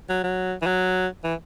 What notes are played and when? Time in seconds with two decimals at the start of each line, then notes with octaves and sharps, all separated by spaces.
0.09 F#3
0.24 F#3
0.62 E3
0.66 F#3
1.24 E3